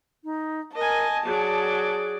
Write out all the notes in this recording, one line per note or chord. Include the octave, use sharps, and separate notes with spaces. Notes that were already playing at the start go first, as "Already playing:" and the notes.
D#4
A#4 D#5 G#5 A5
F#3 G#4 D5